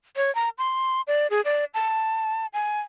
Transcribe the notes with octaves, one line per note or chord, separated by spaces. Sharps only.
C#5
A#5
C6
D5
G#4
D5
A5
G#5